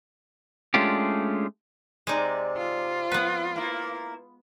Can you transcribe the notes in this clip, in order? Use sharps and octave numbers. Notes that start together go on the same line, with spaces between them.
G#3 A3 C#4 D4 F4 G4
C3 G#3 D#4 D5
F4
F2 B3 B4
A#3 E4